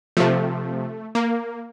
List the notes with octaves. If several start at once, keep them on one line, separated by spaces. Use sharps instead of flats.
C3 F3 A3
A#3